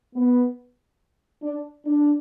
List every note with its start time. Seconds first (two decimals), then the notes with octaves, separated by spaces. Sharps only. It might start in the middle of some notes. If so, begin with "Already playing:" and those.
0.15 B3
1.43 D4
1.86 D4